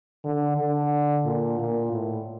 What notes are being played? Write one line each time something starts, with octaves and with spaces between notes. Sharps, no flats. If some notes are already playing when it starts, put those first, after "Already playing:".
D3
D3
A#2
A#2
A2